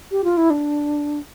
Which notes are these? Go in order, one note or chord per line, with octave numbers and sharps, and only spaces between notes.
G4
F4
E4
D4